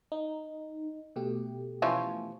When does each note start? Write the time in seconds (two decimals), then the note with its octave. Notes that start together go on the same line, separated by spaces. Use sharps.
0.12 D#4
1.16 B2 A3 G4
1.82 E3 F3 C#4